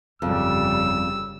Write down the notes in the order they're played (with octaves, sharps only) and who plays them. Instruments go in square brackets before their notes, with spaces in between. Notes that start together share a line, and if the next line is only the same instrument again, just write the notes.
[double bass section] G1 C#3 G3 [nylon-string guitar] F2 [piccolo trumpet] E6